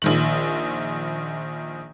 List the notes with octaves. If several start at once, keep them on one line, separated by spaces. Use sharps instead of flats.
A#1 D#3 F#7